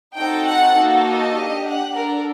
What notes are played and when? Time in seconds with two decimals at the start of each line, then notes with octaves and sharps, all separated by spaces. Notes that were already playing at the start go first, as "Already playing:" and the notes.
0.16 C4 D#4 F#4 A4 G5
0.46 F#5
0.76 A#3 D#4 F#4 A4
1.06 D#5
1.37 D4 G4
1.66 F#5
1.95 D4 A4 A#4